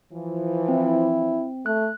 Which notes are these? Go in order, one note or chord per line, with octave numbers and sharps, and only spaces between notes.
E3 F3
C4 E4
A3 F#6